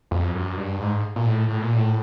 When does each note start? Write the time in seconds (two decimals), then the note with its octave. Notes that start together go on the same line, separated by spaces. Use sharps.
0.11 F2
0.35 F#2
0.57 G2
0.81 G#2
1.16 A#2
1.26 A2
1.49 A2
1.62 A#2
1.75 A2